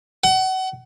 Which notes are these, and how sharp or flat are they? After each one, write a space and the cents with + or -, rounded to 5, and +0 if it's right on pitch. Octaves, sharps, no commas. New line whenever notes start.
F#5 +30